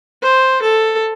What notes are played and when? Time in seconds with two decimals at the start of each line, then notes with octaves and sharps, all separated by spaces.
0.23 C5
0.62 A4